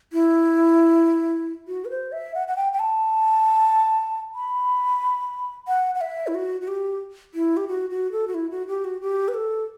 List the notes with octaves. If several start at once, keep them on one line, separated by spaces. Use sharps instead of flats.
E4
F#4
B4
C5
E5
F#5
F#5
G5
G5
A5
B5
F#5
F#5
E5
E4
F#4
F#4
G4
E4
G4
F#4
F#4
A4
F#4
E4
F#4
G4
F#4
G4
B4
A4